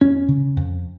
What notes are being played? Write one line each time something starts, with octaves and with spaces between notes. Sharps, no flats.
F2 C#4
C#3
F2